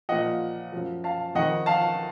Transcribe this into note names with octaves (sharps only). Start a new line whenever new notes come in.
A#2 F3 D#5 F#5
F#2 F3
F5 A5
F2 D#3 D#5 F#5
F5 A5